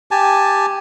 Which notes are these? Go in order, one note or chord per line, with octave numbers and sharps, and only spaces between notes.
G4 G#5 A5